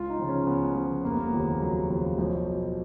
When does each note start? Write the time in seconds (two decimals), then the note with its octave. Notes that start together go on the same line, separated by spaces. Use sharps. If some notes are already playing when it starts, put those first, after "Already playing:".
Already playing: C#2 F4
0.10 D#4
0.19 C#3 F3
0.29 C#4
0.47 C#2 B3
0.75 C#3 F3
1.04 F1 A#3
1.11 B3
1.20 A#3
1.33 D#2 C#3 F3
1.62 F1 F#3
1.89 D#2 C#3 F3
2.18 B1 F3
2.47 B2